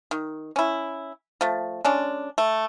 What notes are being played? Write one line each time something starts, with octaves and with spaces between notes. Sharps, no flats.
D#3
C#4 E4
F3 A3
G#3 C#4 D4
A3